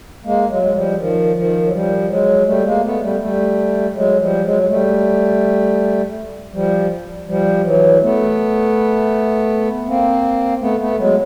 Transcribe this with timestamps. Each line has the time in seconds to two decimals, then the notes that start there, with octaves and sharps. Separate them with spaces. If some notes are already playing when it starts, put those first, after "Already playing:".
0.25 G#3 A#3
0.49 F#3 G#3
0.63 G#3
0.73 F3 G3
0.99 D#3 F3
1.36 D#3 F3
1.65 F#3
1.73 F3 G3
2.10 F#3 G#3
2.46 G3 A3
2.65 G#3 A#3
2.84 A3 B3
3.02 G3 A3
3.20 G3 A3
3.95 F#3 G#3
4.19 F3 G3
4.44 F#3 G#3
4.63 G#3
4.68 G3 A3
6.53 F3 G3
7.28 F3 G3
7.64 E3 F#3
8.02 A3 B3
9.87 A#3 C4
10.61 A3 B3
10.80 A3 B3
10.99 F#3 G#3